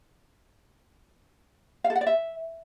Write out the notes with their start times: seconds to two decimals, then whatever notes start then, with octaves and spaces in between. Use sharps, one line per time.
1.84 F5
1.90 A4
1.95 F#5
2.01 D5
2.07 E5